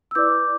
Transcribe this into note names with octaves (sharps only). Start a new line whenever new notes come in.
E6
E4 B4 D5 D6 G6